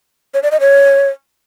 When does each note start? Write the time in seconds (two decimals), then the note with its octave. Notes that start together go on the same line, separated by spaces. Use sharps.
0.34 C#5
0.43 D5
0.52 D#5
0.60 C#5